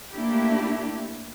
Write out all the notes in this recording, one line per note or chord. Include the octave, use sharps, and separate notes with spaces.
A3 A#3 D4 E4 G4